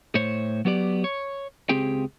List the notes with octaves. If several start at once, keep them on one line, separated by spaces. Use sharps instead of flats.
A2 C5 C#5
F#3 B3 G4 D5
C#5
C#2 C4 G4 G#4 G5